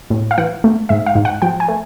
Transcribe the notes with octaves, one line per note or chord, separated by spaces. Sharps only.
A2
F5
E3 F#5
A3
G#2 E5
F5
G#2
F#5
F3 G5
G#5
A3